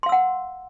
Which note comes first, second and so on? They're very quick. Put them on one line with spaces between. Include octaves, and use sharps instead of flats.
C6 F5 E6 F#5